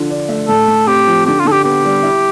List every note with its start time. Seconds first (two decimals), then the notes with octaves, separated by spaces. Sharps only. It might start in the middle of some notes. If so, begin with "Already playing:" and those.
Already playing: D3 F3 F4
0.10 D4
0.29 A3
0.48 A2 A4
0.68 A2
0.87 C4 G4
1.07 F3
1.26 D3 G4
1.40 F4
1.45 D3 A4
1.52 G4
1.64 B3 G4
1.84 G3
2.03 E4